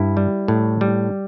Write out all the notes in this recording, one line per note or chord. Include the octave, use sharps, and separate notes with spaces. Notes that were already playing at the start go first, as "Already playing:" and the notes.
Already playing: G2 E4
G3
A2
G3